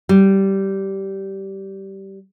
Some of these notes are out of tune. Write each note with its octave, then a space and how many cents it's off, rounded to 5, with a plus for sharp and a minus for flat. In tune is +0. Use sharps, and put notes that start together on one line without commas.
G3 -15